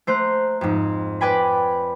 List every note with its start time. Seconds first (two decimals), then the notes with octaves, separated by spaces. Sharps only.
0.07 A3 C5 A#5 F#6
0.61 F2 G#2
1.21 B4 D5 G5 G#5 B5